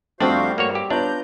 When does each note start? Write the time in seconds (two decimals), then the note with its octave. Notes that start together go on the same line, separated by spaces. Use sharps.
0.20 F2 G3 A3 C4 D4 F#4 C5 F5
0.58 G2 A#3 F#4 C#5
0.75 G4
0.90 B3 D4 F4 C#5 A#5 G6